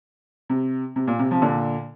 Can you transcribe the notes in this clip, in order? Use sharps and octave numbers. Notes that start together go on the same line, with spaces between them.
C3
C3
A#2
C3
C3 F3
A#2 D3